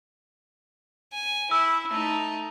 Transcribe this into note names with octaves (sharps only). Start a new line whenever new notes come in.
G#5
E4 E6
A3 D#4